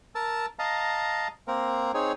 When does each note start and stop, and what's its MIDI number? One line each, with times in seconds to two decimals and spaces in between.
0.15 0.46 70
0.15 0.46 81
0.15 0.46 88
0.59 1.28 75
0.59 1.28 77
0.59 1.28 81
0.59 1.28 82
1.48 1.92 58
1.48 1.92 60
1.48 1.92 70
1.94 2.12 60
1.94 2.12 63
1.94 2.12 68
1.94 2.12 73